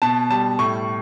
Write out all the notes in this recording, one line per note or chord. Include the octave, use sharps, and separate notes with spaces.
B2 A5
G3 A5
A2 C#6